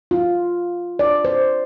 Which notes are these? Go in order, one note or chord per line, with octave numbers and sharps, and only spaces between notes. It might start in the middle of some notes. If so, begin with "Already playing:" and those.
F4
D5
C5